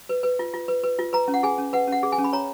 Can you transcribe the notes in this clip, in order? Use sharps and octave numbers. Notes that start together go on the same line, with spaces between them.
B4
B4
F4
F4
B4
B4
F4
B4 A#5
C#4
F#5
G#4 G#5
C#4
B4 F#5
C#4 F#5
G#4
G#5
C#4
B5
C#5 A#5